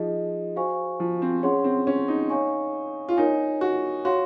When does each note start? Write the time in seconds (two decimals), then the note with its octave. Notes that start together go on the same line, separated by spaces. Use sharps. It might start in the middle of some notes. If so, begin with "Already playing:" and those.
Already playing: F3 D#4 G#4 D#5
0.56 F#4 C5 F5 G#5 C#6
1.00 F3
1.22 C4
1.43 C#4 G#4 C#5 F#5 C6
1.64 C4
1.87 C#4
2.08 D#4
2.30 C#5 F5 G#5 C#6
3.09 F4
3.17 D#4 A#4 C#5 G#5
3.61 F#4
4.05 F#4 C#5 F5 C6